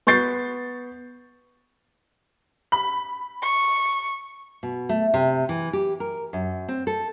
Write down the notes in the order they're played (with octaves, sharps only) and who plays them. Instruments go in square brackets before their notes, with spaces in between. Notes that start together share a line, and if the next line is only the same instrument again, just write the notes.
[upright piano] B3 C#6 G6 A6 C7
[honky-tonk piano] B5
[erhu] C#6
[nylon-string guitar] B2
A3
C3
E3
G4
A#4
F#2
C4
A4